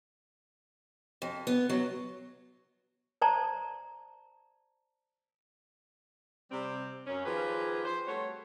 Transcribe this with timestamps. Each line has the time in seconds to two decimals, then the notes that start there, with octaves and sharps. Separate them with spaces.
1.22 F2
1.47 B3
1.70 F#3
3.22 C5 D5 A5 A#5
6.51 C3 G3 C4
7.07 F#2 C#4
7.25 D#3 F3 F4 G4 G#4 B4
7.85 C5
8.06 G3 A3 C4 F#4 C#5